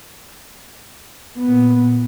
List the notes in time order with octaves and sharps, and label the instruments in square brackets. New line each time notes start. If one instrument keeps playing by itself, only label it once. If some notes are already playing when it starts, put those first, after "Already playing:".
[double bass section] A#2 B3